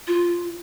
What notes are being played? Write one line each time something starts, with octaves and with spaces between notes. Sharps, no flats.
F4